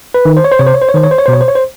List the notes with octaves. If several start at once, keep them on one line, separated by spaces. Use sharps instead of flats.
B4
D#3
C5
C#5
C5
C3 C#5
C5
C#5
C5
C#5
D#3 C5
C#5
C5
C#5
B2 C5
C#5
C5
C#5
C5